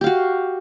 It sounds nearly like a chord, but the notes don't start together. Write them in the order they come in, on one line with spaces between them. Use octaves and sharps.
G4 F5 F#4